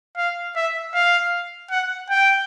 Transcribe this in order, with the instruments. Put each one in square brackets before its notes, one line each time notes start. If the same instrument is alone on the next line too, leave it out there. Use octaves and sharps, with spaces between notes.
[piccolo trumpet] F5
E5
F5
F#5
G5